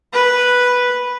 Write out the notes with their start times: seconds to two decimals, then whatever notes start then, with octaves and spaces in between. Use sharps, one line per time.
0.13 B4